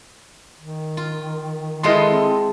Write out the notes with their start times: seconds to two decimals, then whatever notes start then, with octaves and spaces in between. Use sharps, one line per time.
0.59 D#3
0.97 F4
1.83 G#3 E4 F4 A4 D#5 C6
2.10 C4